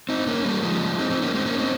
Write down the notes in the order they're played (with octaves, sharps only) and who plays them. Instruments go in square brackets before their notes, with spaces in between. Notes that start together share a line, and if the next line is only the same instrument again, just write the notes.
[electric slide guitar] C4 D#4
A#3 C#4
G3 A#3
F3 G#3
C4 D#4
C4 D#4
A#3 C#4
G#3 C4
A#3 C#4
C4 D#4